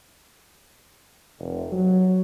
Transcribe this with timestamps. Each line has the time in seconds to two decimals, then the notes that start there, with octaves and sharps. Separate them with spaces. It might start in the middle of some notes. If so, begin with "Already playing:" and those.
1.39 F1
1.72 F#3